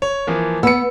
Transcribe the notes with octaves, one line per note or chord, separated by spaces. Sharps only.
C#5
E3 F3 A#3
B3 E6 C#7